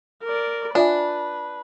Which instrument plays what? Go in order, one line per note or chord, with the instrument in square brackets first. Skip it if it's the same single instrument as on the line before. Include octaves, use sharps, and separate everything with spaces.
[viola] A#4 D5
[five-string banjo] D4 [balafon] F4 E5 G#5 [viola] B4